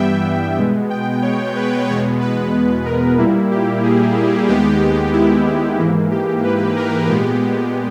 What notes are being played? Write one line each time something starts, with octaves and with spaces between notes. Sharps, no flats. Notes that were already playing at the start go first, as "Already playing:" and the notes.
Already playing: G2 E3 G3 B3 E5 G5
B2 G#3 B3
G5
C#5
B4
E2 B2 G#3 B3 C#5
B4
A#4
A#2 G3 A#3 E4
G4
G#4
D#2 D#3 G#3 B3 G4
E4
E4
G#2 E3 A#3 E4
G4
B4
A#4
A#2 G#3 B3 G4